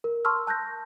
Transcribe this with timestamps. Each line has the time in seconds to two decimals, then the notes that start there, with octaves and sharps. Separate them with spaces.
0.04 A#4
0.25 A5 C6 C#6 E6 F6
0.47 A5 F#6 G6 A#6